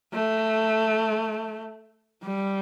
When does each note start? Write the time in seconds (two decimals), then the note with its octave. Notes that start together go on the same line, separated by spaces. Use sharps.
0.13 A3
2.23 G3